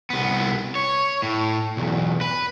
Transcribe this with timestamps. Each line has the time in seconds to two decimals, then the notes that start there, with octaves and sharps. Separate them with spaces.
0.10 C2 B3
0.75 C#5
1.22 A2
1.77 B1 E2
2.21 B4